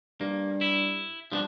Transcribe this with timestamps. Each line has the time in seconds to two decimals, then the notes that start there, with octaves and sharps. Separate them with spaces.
0.21 G2 A#3
0.61 E4
1.32 G2 F3 B3 D4